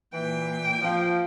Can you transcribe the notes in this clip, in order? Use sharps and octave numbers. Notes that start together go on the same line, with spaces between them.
A#2 E3 G5
F3